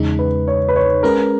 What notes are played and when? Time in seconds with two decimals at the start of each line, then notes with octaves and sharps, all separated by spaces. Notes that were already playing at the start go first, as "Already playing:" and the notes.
Already playing: E2 C#3 G#3 D#4
0.19 B4
0.48 C#5
0.69 B4
0.76 C#5
1.03 G#3 C#4 G#4 A#4 B4